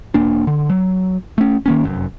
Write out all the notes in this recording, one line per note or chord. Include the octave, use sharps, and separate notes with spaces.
E1 A#3 D4
D3
F#3
A3 C#4
D#3 A#3 C#4
F1 F#2